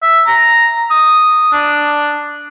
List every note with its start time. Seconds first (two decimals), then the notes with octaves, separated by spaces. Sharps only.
0.02 E5
0.27 A#5
0.91 D#6
1.53 D4